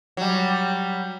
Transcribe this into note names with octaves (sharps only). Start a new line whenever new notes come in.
F#3 G3